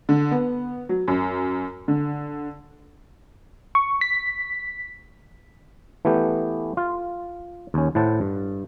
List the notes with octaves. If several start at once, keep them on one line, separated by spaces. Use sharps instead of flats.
D3
B3
F#3
F#2
D3
C#6
B6
E3 A3 B3 G4
F4
D#2 C#4
A2 E4 C5 F#5 A5
G2